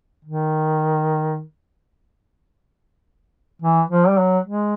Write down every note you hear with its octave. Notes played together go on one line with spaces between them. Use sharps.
D#3
E3
F3
G3
F#3
G#3